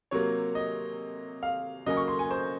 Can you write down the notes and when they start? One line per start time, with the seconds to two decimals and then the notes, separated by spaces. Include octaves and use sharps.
0.11 C3 F#3 A#3 C#5
0.55 D#5
1.43 F5
1.86 C#3 F#3 A#3 C#4 D#5
1.97 C#6
2.08 C6
2.19 G#5
2.31 C5